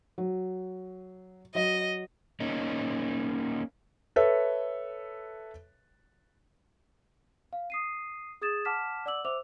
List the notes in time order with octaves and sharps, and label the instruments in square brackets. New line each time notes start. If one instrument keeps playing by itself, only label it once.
[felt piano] F#3
[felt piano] F#3 [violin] D#5
[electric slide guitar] A#3 C#4 D#4
[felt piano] A4 B4 C#5 E5
[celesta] F5
D#6 C7 D#7
G#4 D#6 G#6 A6 E7
F#5 A5 D6 F6 B6 E7
D5 F#5 D6 E6 F#7
C5 E5 D6 E6 F7